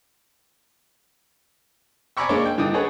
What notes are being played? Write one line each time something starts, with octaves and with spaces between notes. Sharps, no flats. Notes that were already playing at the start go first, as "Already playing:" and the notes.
D5 G#5 A#5 B5 C#6 E6
G#3 A#3 D4 C#5 D6
G5
G2 D3 D#4 G5 D#6
G#4 A4 B4 C#5 F#5